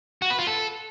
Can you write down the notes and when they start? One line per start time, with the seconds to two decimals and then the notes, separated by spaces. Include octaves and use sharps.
0.22 F#4
0.30 B4
0.39 F4
0.47 A4